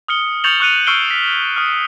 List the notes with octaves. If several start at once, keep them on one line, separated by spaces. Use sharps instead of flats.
D#6 F6 C#7 G7
C#6 G6 A6 C#7 F7 F#7
C#6 F6 F#6 C#7 D#7 F7
C#6 E6 F6 C7 D7 G7
B6
D#6 F6